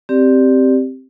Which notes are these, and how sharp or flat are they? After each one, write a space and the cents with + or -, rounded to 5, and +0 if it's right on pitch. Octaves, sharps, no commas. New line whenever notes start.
C4 +0 G4 +0 D5 +0